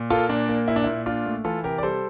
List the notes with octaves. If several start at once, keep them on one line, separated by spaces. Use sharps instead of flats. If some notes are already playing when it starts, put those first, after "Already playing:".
Already playing: A#2
A#3 F4 A4
A#2 D4
A#3
A#2 E4
D4
A#2 E4
A#2 D4 F4
A3
E3 F4 A4
C3 G4 A#4
D5
G3 A4 C5